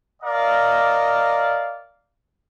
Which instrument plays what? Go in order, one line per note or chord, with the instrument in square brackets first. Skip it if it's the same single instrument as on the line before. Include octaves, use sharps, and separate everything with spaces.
[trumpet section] A#4 D5 D#5 F5